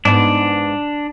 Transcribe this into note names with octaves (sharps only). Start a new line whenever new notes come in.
G#2 B3 D4